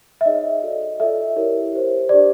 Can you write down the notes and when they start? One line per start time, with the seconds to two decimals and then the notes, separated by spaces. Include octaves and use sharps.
0.21 E5
0.25 D#4 G#4 C#5 D#5
0.63 F#4 A4 D5
1.00 F4 A4 D5 E5
1.36 E4 G4 A#4 C#5
1.73 G4 C5
2.09 D4 G4 C5 D5